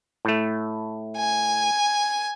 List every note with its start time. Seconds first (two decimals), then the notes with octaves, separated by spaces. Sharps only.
0.25 A2 A3
1.17 G#5